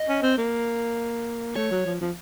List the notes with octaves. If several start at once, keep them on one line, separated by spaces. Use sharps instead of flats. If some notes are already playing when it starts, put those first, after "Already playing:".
Already playing: D#5
C#4
C4
A#3
A3 C#5
F#3
F3
F3